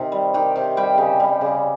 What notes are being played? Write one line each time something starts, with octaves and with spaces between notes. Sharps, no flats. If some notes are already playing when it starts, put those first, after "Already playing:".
Already playing: C3 D#3
G3
D#3 G4 G5
C3
G3 G4 G5
C#3
G3
C#3